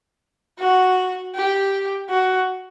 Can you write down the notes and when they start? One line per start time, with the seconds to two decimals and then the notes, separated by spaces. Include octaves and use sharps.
0.59 F#4
1.35 G4
2.09 F#4